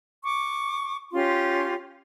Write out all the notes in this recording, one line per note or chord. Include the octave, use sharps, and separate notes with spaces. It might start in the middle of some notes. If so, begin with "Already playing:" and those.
C#6 D6
C#4 F4 G4 C6